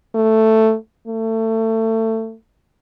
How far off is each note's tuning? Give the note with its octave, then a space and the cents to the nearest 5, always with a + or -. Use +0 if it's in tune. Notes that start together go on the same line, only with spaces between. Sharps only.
A3 +5
A3 +25